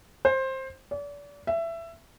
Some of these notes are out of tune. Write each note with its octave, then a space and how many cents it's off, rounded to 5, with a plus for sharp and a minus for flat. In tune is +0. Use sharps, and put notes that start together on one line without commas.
C5 +15
D5 -35
E5 +20